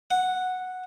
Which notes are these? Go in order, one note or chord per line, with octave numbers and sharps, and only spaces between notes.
F#5